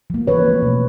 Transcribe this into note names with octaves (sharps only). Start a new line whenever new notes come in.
F3 A#3
E3 B4 C#5
A3 C4
B2